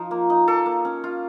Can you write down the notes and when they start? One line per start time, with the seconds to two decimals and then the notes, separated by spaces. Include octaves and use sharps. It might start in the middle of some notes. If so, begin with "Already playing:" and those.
Already playing: F3 D#4
0.11 A#3
0.30 D#4
0.48 A#3 A4
0.66 A#3
0.85 C#4
1.04 F4